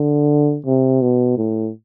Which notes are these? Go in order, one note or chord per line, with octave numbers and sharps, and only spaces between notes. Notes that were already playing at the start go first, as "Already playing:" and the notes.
Already playing: D3
C3
B2
A2